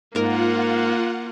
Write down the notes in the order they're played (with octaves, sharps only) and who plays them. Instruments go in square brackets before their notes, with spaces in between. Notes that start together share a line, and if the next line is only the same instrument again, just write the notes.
[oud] G#2 A#4 [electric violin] A#3 [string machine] F4 F#5